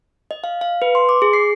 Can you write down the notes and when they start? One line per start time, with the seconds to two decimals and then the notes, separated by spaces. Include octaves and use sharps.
0.31 D#5
0.44 F5
0.61 F5
0.82 B4
0.95 C6
1.09 D6
1.22 G#4
1.33 C7